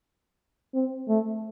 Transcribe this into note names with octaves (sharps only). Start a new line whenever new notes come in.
C4
A3